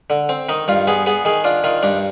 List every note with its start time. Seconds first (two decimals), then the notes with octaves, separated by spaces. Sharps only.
0.10 D3
0.29 C4
0.49 D#3 D#4
0.68 G2 F4
0.87 B3 G#4
1.06 B3 G#4
1.25 D#3 G#4
1.44 D4 F4
1.64 D#3 F4
1.83 G2 D4